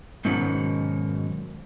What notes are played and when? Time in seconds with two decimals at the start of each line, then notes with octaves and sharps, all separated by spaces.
0.25 G#2 B2 D#3 F#3 C#4